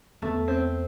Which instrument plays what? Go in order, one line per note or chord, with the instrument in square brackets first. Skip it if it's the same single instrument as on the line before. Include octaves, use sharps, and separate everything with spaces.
[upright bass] E2 [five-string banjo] A3
[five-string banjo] C4